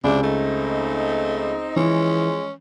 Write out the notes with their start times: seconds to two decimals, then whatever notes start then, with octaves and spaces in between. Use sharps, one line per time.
0.04 C#2 C3 D4
0.23 A3 C4 D#4
1.76 E3 F3 G#3 C#4